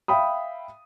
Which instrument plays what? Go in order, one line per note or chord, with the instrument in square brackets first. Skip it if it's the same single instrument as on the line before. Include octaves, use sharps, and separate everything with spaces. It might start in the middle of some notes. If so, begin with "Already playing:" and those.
[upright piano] E5 F5 G5 B5 D#6